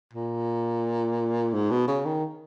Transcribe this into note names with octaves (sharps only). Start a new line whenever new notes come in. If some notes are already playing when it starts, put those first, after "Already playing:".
A#2
G#2
B2
C#3
D#3